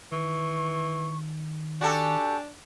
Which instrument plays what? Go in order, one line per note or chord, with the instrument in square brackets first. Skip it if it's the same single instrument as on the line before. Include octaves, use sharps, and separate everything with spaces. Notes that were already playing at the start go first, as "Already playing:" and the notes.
[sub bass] D#3 [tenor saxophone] E3 [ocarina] C#6
[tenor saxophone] D4 [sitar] F#4 G4 A4 [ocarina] G#5